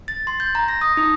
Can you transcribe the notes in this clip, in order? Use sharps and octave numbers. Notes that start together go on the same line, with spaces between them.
A6
C6
G6
A#5
A#6
D#6
D#4